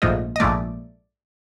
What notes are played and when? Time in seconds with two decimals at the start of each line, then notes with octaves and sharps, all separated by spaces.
0.02 A#1 G#2 F3 A3 D#5
0.36 D#5
0.40 A#1 G#2 F3 A3 D5